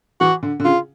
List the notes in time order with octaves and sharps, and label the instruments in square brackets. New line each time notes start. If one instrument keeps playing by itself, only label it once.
[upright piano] E3 [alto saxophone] F#4
[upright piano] D3
D3
[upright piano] C#3 [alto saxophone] F4